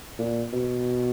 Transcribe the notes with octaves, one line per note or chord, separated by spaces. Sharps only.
A#2
B2